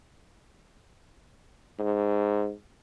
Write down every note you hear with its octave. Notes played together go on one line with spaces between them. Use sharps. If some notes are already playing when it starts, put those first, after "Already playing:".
G#2